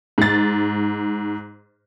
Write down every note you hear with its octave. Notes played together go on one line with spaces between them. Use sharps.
G#2 A6